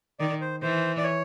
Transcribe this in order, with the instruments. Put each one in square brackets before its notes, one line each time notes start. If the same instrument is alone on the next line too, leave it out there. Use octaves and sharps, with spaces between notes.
[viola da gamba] D#3 [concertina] D5
[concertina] C5
[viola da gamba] E3 [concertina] C5
[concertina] D5
C#5